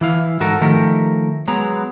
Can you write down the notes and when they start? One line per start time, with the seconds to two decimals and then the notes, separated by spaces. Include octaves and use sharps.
0.01 E3 E4 F5
0.40 G#2 F#4 A4 A#4
0.61 D#3 F3 A3 G4 A#4
1.48 F#3 G#3 B3 A#5